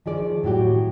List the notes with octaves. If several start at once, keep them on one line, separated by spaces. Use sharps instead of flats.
D#3 F3 G#4 D5
A2 F#3 F#4 G4